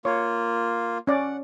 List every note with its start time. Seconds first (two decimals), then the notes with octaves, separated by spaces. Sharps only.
0.05 A#3 F4 C#5
1.07 C#4 D5 F#5